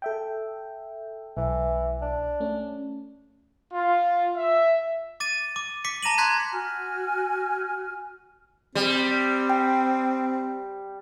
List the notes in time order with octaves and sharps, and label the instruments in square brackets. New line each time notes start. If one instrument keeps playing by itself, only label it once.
[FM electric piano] A4 E5 G5
[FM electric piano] B1 [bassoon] E3
[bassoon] D4
[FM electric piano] A3 C#4
[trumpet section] F4
E5
[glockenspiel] D6 A6 D#7
D6
D6 B6 C#7
A5 A#5 A#6 D#7 F#7
A#5 C6 F#6 G#6 B6
[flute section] F#4 G#5 F6
[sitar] G3 [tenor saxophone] C4
[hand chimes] G5